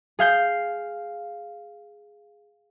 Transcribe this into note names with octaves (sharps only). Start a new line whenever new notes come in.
G#4 F5 G6 C7